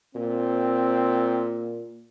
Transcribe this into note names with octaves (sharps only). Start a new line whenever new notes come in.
A#2 C4